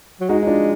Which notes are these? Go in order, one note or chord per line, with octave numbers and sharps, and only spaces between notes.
F#3
G#3 D#4 F#4
D#4
D4 F4